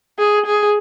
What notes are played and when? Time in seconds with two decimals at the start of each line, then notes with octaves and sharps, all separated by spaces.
0.18 G#4
0.46 G#4